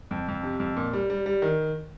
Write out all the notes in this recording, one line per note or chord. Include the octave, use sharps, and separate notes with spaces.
F2
F2
C3
F2
A#2
G3
G3
G3
D#3